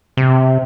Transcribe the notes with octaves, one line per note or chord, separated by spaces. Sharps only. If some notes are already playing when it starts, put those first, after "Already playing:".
C3